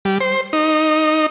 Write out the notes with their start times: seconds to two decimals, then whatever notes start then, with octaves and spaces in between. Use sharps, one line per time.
0.05 G3
0.21 C5
0.53 D#4